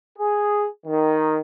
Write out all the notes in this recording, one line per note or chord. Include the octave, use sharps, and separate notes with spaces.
G#4
D#3